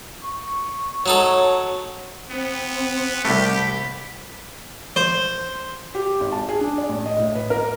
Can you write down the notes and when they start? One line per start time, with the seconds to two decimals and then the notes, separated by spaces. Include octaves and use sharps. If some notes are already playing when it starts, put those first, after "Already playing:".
0.24 C#6
1.06 F#3 D#4 A4 C#5
2.31 B3 C4
3.25 C2 C3 A3 G4 B5
4.96 C5
5.95 G4
6.20 G#1
6.32 A5
6.49 G#4
6.61 D4
6.78 D5
6.89 A1
7.06 D#5
7.19 A2
7.35 B4
7.50 A#4